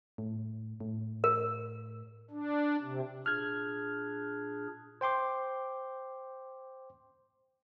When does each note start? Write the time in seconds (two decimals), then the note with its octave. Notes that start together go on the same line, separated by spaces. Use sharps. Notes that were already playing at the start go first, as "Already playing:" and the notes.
0.18 A2
0.80 A2
1.24 A#4
2.30 D4
2.81 C3
3.26 A#2 D4 G#4 F6 F#6 G#6
5.01 C5 G5 C6 D6